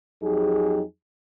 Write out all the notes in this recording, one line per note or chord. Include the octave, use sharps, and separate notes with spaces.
F2 F#3 D#4 G4 G#4